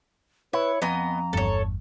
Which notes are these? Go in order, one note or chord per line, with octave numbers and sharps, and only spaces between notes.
E4 B4 C#5
F2 B3 D#5 G#5 A#5
G1 E2 G2 A4 C#5